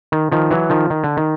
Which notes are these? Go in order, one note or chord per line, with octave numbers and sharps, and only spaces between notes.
D#3
D#3 F3
E3 F#3
D#3 F3
D#3
D3
D#3